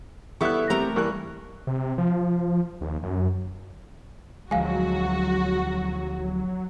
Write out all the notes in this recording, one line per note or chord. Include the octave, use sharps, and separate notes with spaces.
G3 B3 E4 A4 E5 C#6 F#6
C3 A3 C4 G4 A#4 A#5
G2 E3 A#3 C#6 F#6
C3
F3
D#2
F#2
D2 F3 F#3 G#3 F#4 F5 G#5